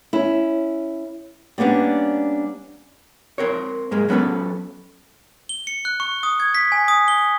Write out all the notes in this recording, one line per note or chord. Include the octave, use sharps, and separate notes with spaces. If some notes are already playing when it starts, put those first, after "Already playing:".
C#4 E4
G3 A#3 B3 C#4 D4
C4 A#4 C#5
G#2 G#3 A#3
F#3 B3 C#4 A4 B4
G7
C#7
F#6
C#6
D#6
G#6
B6
G#5
D#6
G7